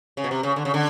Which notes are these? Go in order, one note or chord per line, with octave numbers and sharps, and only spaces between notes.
C#3
B2
C3
C#3
D3
C#3
D3